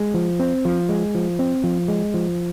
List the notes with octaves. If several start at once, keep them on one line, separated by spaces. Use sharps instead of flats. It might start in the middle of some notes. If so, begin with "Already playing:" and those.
Already playing: G#3
F3
C4
F3
G#3
F3
C4
F3
G#3
F3